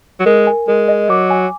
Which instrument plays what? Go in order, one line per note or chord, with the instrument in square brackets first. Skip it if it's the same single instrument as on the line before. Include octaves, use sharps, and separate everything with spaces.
[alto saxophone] F#3
[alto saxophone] G#3 [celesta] A#4
[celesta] G#5
[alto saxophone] G#3 [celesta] A#4
[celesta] D#5
[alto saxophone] F#3 [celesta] D6
[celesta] G#5